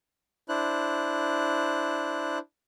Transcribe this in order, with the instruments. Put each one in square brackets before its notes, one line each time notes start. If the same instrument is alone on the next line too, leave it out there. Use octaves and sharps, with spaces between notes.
[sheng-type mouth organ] D4 E4 C5 F#6